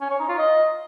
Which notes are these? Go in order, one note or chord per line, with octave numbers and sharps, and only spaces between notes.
C#4
C#5
D#4
F4
D#5